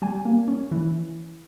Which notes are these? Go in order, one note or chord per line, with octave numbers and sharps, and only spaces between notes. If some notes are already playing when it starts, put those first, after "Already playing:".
G3 G#5
A#3
C#4
E3